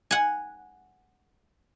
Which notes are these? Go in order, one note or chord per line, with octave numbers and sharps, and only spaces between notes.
F#5 G#5